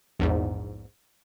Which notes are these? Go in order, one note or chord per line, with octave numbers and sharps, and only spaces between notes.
A#1 E2 G#2